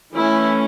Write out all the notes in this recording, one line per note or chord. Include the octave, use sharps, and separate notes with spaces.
E3 A3 C#4 E4